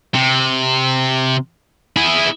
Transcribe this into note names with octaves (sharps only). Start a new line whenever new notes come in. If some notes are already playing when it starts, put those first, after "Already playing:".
C3
E4 G#4